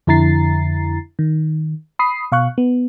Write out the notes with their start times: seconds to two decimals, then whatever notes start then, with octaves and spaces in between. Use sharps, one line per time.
0.07 F2 D3 E4 A#5 A6 C7
1.19 D#3
1.99 B5 D#6 C7
2.32 B2 F5 C#6 F#6
2.58 B3